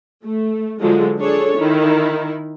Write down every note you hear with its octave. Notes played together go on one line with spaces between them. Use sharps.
A3
D3 F3 F#3 G#3
D4 G#4 A4 C#5
D#3 E4